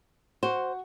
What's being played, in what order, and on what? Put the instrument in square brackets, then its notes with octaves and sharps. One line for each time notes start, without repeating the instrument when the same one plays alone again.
[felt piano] F#4 F#5 C#6 [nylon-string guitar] C5